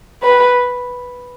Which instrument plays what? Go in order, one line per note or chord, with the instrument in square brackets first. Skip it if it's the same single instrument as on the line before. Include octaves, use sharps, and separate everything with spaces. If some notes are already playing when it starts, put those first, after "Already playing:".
[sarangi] B4